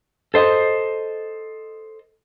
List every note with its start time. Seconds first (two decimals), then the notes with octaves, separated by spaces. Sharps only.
0.34 A4 C5 D#5